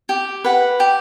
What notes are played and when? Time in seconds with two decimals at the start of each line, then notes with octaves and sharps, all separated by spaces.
0.09 G4
0.44 B4 F#5
0.80 G4